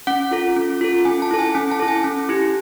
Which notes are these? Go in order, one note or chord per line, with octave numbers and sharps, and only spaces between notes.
C#4 F#5
F4 A4
C#4
F4 A4
C#4 G#5
A5
E4 A4
G#5
C#4 G#5
A5
E4 A4
G#5
C#4
E4 G4